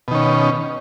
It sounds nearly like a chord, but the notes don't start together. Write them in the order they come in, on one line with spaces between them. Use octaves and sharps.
B2 D#3 C#4